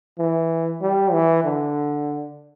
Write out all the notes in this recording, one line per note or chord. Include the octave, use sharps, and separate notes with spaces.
E3
G3
E3
D3